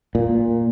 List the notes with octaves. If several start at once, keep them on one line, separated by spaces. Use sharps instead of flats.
A#2